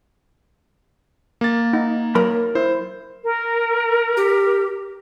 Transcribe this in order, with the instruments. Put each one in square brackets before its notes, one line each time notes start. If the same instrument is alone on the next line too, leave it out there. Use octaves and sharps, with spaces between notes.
[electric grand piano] A#3 A6
[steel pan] D#4
[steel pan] F#3 [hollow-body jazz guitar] A#4 B5
[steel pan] E4 [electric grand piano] C5
[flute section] A#4
[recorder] G4